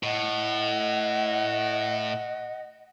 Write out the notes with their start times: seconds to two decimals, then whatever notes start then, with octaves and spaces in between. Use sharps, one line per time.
0.03 A2 D#5 F#5